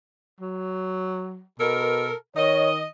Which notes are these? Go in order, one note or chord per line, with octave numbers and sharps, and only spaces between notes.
F#3
B2 A4 A#4
D#3 C#5 D#5